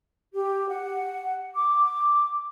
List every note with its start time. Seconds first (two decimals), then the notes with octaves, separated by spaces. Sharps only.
0.34 G4
0.69 F#5
1.55 D6